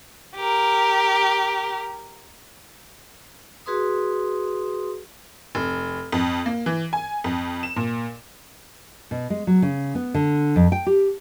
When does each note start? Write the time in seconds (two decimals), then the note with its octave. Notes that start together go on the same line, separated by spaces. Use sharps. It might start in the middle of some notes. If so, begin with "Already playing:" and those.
0.36 G4 A#4
3.66 F#4 G#4 B4 C6 D#6
5.55 F1
6.12 F2
6.46 A#3
6.66 E3
6.93 G#5
7.24 F2
7.63 E7
7.76 A#2
9.11 B2
9.30 G#3
9.47 F#3
9.62 C#3
9.95 B3
10.14 D3
10.56 F2
10.72 G5
10.87 G4